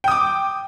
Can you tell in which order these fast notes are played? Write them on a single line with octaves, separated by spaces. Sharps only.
G5 D#6 D6